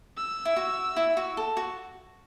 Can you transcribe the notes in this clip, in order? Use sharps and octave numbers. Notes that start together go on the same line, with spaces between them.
E6
E4
F#4
E4
F#4
A4
F#4